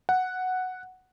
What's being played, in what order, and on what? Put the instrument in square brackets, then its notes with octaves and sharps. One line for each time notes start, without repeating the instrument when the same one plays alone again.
[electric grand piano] F#5